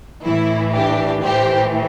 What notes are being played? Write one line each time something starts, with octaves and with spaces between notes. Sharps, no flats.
A2 E3 E4
D4 G4
A2 E3 G4 C5